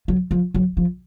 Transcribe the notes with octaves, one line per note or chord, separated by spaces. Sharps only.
F#3
F3
F#3
F3